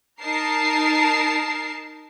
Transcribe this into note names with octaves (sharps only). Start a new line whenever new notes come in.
D#4 A#4 A5 C7